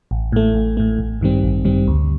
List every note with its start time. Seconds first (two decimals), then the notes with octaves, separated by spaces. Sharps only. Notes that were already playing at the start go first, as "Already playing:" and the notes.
0.11 A1
0.32 A2 A3
0.55 A1
0.77 A2 A3
0.99 A1
1.21 G2 D#3 G3 C4
1.43 A1
1.65 G2 D#3 G3 C4
1.87 D2